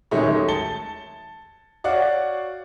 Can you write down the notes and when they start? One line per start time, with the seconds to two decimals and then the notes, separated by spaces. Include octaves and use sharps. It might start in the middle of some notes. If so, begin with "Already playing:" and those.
0.11 D#1 D#3 F#3 G#3 A3 C#5
0.48 A5 A6 C#7 G7
1.84 F#4 C#5 D5 F5 F#5